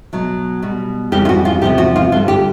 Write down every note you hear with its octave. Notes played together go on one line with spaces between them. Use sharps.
B2 F#3
B2 G3
F2 C#3 E3 G3 G4
F4
F#4
F4
E2 C3 F3 G4
F#4
F4
G2 D3 G3 F4
G4